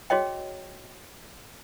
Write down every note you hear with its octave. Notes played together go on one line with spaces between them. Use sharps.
F#4 G#4 C#5 D#5 G5